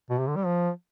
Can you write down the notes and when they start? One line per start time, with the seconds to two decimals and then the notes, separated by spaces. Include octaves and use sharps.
0.10 B2
0.19 C3
0.28 D3
0.36 G3
0.45 F3